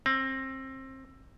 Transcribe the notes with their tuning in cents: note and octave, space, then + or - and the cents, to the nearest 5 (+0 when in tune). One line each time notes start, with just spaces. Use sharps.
C4 +25